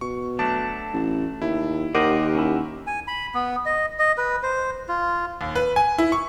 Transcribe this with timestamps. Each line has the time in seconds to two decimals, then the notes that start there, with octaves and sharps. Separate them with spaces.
0.01 B2 C#6
0.39 F#3 A3 D4 A5
0.93 A1
1.42 D#2 E4
1.94 D#2 G4 A#4 C5 D5 D#5 F#5
2.35 C#4 E4
2.87 G#5
3.07 B5
3.35 B3
3.66 D#5
3.99 D#5
4.18 B4
4.43 C5
4.88 F4
5.41 D#2
5.55 B4
5.76 G#5
5.98 E4
6.12 C#6